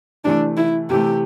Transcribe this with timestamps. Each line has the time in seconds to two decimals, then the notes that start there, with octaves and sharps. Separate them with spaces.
0.25 C3 E3 A3 D4
0.57 E4
0.90 C3 E3 A3 G4